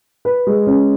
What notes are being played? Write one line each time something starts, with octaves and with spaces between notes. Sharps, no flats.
B4
G#3
C#4